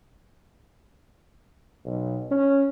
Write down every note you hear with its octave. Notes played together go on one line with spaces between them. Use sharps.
B1
C#4